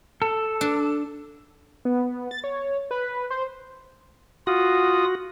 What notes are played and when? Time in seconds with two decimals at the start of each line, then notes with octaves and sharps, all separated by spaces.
0.22 A4
0.61 D4
1.85 B3
2.31 A6
2.44 C#5
2.91 B4
3.30 C5
4.47 F4 F#4 D#6